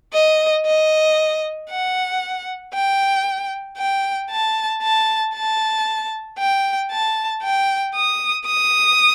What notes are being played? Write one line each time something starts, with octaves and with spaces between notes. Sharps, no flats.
D#5
D#5
F#5
G5
G5
A5
A5
A5
G5
A5
G5
D#6
D#6